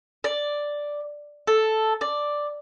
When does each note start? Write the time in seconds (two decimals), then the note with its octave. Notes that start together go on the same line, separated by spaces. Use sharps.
0.24 D5
1.47 A4
2.01 D5